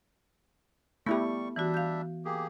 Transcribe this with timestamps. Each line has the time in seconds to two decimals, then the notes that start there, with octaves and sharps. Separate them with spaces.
1.06 G3 A3 B3 E4 G4 C#6
1.56 E3 G3 D4 F#4 E5
1.74 F5 G6
2.25 A#3 G4 G#4